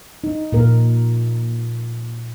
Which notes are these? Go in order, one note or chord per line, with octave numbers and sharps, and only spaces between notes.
D#4
A#2 A#4